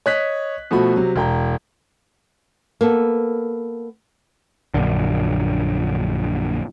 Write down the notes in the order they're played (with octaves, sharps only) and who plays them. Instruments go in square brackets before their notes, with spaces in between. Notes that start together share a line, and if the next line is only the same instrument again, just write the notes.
[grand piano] C#5 D#5 F#6 B6
B2 F3 A3 F#4 B5
C3 F#3
E1 G5 A#5
[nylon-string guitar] A#3 B3 A4
[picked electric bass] A#1 F#2 D3